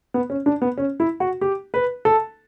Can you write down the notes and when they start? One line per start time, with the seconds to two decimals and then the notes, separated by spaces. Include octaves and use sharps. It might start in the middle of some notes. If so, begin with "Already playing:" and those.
0.14 B3
0.30 C#4
0.46 D4
0.62 B3
0.78 C#4
1.00 E4
1.20 F#4
1.41 G4
1.74 B4
2.05 A4